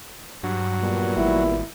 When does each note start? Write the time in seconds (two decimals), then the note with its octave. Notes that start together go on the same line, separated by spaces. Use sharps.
0.43 G2 F#3
0.80 A#2 G3 B3
1.17 G#1 E4